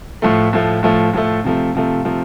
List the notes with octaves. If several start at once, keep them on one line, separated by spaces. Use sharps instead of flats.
A2 F3 A3
A2 F3 A3
A2 F3 A3
A2 F3 A3
C3 F3 A3
C3 F3 A3
C3 F3 A3